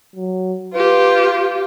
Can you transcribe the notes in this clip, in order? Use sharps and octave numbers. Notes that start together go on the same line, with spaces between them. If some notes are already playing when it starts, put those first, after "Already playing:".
F#3
F4 G4 B4